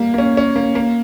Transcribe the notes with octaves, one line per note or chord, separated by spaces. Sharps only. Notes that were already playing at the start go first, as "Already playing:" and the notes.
Already playing: G3 A#3
A#3
C#4
C#4
A#3
A#3